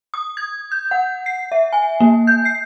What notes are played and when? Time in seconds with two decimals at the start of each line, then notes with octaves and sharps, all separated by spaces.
0.14 D#6
0.37 G#6
0.72 G6
0.91 F#5
1.26 C7
1.52 E5
1.73 G#5
2.00 A#3
2.27 G6
2.45 C7